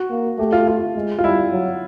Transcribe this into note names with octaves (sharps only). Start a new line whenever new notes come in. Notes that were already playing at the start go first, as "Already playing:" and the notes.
Already playing: F#4
A#3
A3 G4
F4
F4
G#3
F4
G3 E4
F#3